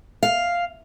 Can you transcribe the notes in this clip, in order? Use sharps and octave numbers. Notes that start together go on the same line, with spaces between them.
F5